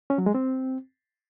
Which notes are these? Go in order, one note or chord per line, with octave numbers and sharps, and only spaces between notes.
C#4
F#3
G#3
C4